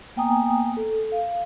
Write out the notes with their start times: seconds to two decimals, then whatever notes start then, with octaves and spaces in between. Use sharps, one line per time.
0.16 A#3 B3 G5 G#5 A#5 D#6
0.77 A4
1.12 F5